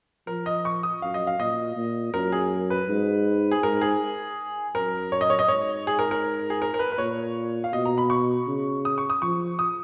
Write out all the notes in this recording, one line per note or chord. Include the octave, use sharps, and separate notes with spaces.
F3 A#4
D#5
C#6
D#6
F#2 F5
D#5
F5
A#2 D#5
A#2
F#2 A#4
G#4
B4
G#2
G#4
G#2 A#4
G#4
F#2 A#4
C#5
D#5
C#5
D#5
G#2 C#5
G#4
A#4
A#4
G#4
A#4
A#4
B4
B4
A#2 C#5
F5
B2 D#5
A#5
B5
C#6
C#3
D#6
C#6
D#6
F3 C#6
D#6